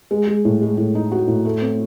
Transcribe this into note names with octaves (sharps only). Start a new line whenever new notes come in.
G#3
G#3
A2
G#3
A2
D#4
F#4
A2
A3
C4